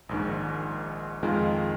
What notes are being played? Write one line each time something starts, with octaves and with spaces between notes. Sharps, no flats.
A#1 G#2 D#3
F2 D#3 G#3 F4 A#4